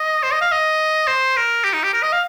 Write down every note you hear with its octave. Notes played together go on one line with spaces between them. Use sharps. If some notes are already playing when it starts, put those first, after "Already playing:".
Already playing: D#5
C5
D#5
F5
D#5
C5
A#4
G4
D#4
G4
A#4
D#5
F5